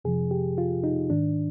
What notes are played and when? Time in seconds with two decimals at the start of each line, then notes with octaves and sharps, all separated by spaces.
0.05 F2 C3 F3 G#4
0.31 G4
0.58 F4
0.84 D#4
1.10 G#2 D#3 D4